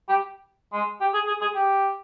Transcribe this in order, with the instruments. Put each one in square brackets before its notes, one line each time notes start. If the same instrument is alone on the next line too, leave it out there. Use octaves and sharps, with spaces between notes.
[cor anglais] G4
G#3
G4
G#4
G#4
G#4
G4